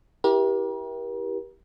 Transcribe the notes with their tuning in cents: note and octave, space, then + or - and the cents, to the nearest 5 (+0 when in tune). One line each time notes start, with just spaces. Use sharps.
E4 +0 G4 +0 A#4 +40